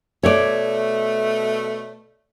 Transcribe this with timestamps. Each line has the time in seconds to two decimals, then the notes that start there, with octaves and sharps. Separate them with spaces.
0.23 B2 A3 C#5 D5